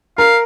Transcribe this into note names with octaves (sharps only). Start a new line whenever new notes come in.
A#4 F5